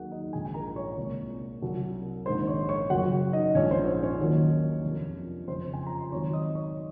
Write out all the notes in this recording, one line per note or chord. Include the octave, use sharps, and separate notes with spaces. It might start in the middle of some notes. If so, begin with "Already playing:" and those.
Already playing: D#2 D#3 F#3 A#3 F#4 G#4 F#5
D#4 D#5
A#1 G#2 F3 G#4 G#5
G#5
A#4 A#5
C#5 C#6
C2 A#2 G#3
C2 C3 F#3
A#1 G#2 D#3 G#3 C5 C6
C#5 C#6
C#5 C#6
F#1 F#2 C#3 F#3 F#4 F#5
F#4 F#5
D#4 D#5
A#1 G#2 F3 G#3 C#4 C#5
C5
C5
C#4 C#5
D#2 D#3 F#3 A#3
F2 C3 F3
F#1 F2 C#3 F3 C5 C6
G#5
A#5
C6
G#1 G#2 F#3 C#5 C#6
D#5 D#6
C#5 C#6